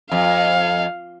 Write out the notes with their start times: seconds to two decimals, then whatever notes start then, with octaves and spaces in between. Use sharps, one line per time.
0.12 F2 F5